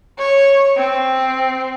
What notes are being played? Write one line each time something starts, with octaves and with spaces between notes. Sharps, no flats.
C#5
C4